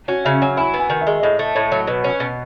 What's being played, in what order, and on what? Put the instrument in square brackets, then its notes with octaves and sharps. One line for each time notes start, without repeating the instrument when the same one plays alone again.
[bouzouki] C#4 [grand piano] F#4
[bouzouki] C#3 [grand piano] E5
[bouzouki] F#3 [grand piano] G#5
[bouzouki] E4 [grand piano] G#5
[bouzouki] B3
[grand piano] G#5
[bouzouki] D#3
[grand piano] E5
[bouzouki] G#3
[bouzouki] A2 [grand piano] D#5
[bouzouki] A3
[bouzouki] A2 [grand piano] C#5
[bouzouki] F#3
[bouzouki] B2 [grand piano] B4
[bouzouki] C#4
B2